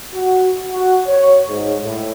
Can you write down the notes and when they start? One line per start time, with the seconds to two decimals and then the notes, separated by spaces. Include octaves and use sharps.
0.14 F#4
0.72 F#4
1.07 C#5
1.47 G#2
1.83 A2